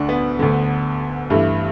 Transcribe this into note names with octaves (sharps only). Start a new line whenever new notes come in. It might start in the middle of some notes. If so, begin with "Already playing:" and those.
Already playing: D2 D3 D4 F#4
B3
D2 D3
G2 E3 A3